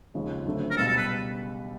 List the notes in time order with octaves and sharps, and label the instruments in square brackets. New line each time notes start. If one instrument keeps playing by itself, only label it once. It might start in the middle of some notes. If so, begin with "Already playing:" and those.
[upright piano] D#2 C#3 F3 G#3
D2 D3 F#3 A3 C#4
[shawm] A#4
[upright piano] C#2 B2 G3 [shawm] A4
[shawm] A4
B4